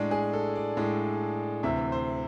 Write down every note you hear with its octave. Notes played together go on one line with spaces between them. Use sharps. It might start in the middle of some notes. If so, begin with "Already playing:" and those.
Already playing: A2 G#3 D4
G#4
A4
D5
A2 G#3 D4
D2 C3 E3 E5
C5